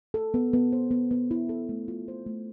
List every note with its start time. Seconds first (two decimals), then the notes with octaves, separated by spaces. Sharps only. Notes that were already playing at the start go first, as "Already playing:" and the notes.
0.14 A4
0.34 B3
0.53 B3
0.72 C5
0.91 B3
1.11 B3
1.31 E4
1.49 A4
1.69 A3
1.88 F4
2.08 C5
2.26 A3